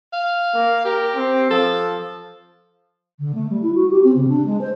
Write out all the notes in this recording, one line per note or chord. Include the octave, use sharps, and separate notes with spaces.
F5
A#3
G4 A#4
C4
F3 A4
D3
A3
G3
E4
F#4
G4
C4
C#3
D4
G#3
C5